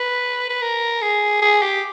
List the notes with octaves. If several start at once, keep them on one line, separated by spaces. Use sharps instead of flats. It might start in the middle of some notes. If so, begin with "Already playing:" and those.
Already playing: B4
B4
A#4
G#4
G#4
G4